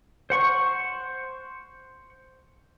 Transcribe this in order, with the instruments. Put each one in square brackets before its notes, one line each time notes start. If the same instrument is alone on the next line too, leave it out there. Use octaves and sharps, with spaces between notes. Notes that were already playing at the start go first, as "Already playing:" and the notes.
[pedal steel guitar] C5 F#5 C#6